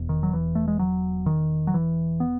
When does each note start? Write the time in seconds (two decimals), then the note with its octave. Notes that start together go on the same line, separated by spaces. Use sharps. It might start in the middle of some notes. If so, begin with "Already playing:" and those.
Already playing: E1 E2 B2
0.09 D#3
0.23 F#3
0.33 E3
0.55 A3
0.68 G#3
0.79 F#3
1.26 D#3
1.67 F#3
1.74 E3
2.20 B3